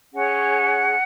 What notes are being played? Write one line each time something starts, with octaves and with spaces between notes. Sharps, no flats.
C#4 G#4 C#5 F#5